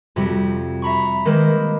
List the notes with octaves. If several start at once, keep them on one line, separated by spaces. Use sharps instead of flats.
F2 C3 G3 F#4
E5 A#5 B5 C#6
D#3 G#3 A#3 B4 C5